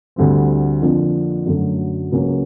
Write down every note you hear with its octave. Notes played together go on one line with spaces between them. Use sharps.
D2 D3 G3 C4
F2 D3 F3 A#3 D4
F#2 D3 F#3 A3
C#2 C#3 F#3 A#3 C#4